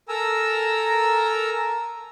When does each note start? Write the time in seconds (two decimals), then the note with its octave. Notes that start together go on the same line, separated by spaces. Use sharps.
0.09 A4 A#4 G#5 A#5 E6